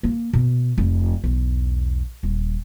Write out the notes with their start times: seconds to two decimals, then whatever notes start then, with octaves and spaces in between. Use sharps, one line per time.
0.03 A#3
0.33 B2
0.78 F1
1.24 B1 E2
2.23 D#1